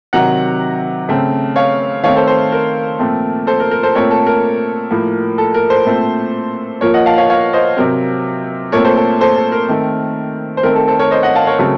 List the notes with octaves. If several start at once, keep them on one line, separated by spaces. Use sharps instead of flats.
C3 D#3 F#3 F#5 A#5
C#3 A3 C4
C#5 F5
D#3 A3 C4 C#5 F5
A4 C5
A4 C5
A#4
A#2 F3 A3 C4
A4 C5
A#4
A#4
A4 C5
A#2 A3 C4 A#4 C#5
A4
A#4
A2 F3 A#3
A4
A#4
A4 C5
A#2 A3 C4
A#2 F3 A#3 A#4 C#5
D#5 F#5
F5 A5
C#5 F5
C#5 F5
C5 D#5
C3 F#3 C4 A#4
A#2 A3 C4 A#4 C#5
A4 C5
A4
A4 C5
A4
A#4
D#3 A3 C4
C5
D#3 A3 C4 A#4
A4
A4 C5
A#4 C#5
C5 D#5
D#5 F#5
F5 A5
A#4 C#5
C#3 F#3 A3 C4